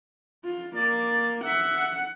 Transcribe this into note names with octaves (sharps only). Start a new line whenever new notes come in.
F4
A#3 D5
E5 F#5